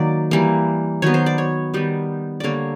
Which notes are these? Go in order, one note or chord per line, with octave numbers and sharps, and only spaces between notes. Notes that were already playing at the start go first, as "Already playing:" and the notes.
Already playing: D#3 F#3 A#3 D5
E3 G3 A#3
D#3 F#3 B3 C#5
C5
D5
C#5
D#3 G3 B3
D3 G3 A#3 C#5 D5